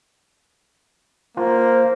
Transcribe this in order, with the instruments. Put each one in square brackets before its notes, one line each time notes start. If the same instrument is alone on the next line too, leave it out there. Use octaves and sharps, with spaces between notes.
[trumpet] A#3 [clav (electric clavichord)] F4 [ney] C5